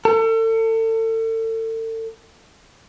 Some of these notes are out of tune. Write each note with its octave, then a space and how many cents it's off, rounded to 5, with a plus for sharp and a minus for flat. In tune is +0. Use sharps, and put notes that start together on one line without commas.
A4 +35